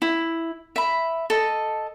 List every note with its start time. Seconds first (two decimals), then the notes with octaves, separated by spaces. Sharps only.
0.02 E4
0.76 E5 B5
1.30 A4 D#5